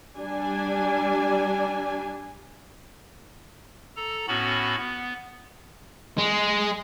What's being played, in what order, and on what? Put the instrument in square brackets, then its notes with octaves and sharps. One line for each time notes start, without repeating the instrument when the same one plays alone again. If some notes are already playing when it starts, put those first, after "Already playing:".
[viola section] G3 D4 G#5
[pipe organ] A4 A#5
A2 B3 C#4 F#4 B5
B3
[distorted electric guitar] G#3